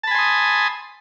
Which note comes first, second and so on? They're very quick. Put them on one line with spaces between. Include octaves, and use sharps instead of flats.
A5 B5 G#5 C6 D#6